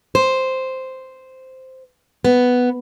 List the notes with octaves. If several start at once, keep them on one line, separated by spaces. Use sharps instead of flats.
C5
B3